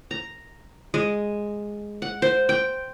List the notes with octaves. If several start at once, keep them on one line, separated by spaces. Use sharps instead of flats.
A#5
G#3
F#5
C5
G5